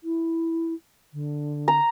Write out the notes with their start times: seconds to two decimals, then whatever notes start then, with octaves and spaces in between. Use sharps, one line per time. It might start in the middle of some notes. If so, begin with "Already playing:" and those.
0.04 E4
1.13 D3
1.68 A#5